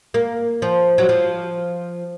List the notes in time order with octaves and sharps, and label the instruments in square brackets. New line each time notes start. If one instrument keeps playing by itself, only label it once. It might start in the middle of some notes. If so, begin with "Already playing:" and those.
[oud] A#3
F3
F#3
F3